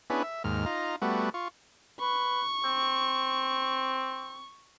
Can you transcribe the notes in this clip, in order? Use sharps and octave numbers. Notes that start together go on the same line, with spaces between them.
B3 C#4 D4 E4 G#4 B4
E5
D#2 G#2 F6
D#4 F4 A#5
G3 A3 B3 F#4
F4 C#6
B4 C#6
C4